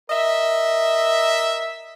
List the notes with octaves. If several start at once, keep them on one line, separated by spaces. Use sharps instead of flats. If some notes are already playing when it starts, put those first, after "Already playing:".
A#4 D#5 E5